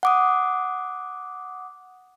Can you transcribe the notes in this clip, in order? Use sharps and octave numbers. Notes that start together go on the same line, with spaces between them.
F#5 D6 D#6